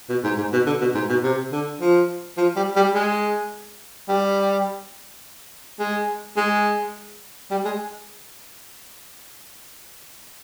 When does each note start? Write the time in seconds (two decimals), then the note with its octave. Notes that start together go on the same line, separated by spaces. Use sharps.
0.09 B2
0.24 G#2
0.38 G#2
0.53 B2
0.66 D3
0.81 B2
0.95 G#2
1.09 B2
1.23 C3
1.52 D3
1.81 F3
2.37 F3
2.56 G3
2.76 G3
2.94 G#3
4.08 G3
5.80 G#3
6.37 G#3
7.51 G3
7.65 G#3